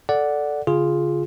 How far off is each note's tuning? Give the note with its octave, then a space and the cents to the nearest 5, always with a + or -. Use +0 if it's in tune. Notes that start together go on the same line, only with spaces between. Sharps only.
A4 +0 D5 -5 F#5 +0
D3 -45 F4 +0 G#4 +0